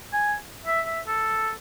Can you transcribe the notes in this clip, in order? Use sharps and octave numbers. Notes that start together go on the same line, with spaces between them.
G#5
E5
E5
A4